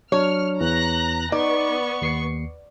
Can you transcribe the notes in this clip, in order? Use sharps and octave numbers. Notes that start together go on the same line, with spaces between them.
F#3 D4 C#5 F6
E2 E3 A#5 F#6 A#6
B3 D#4 D5 C#6
D#2 C7 C#7